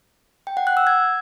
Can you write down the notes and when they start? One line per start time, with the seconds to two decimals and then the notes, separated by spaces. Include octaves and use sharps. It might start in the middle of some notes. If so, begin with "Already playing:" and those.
0.47 G5
0.57 F#5
0.67 F#6
0.77 E6
0.87 G#6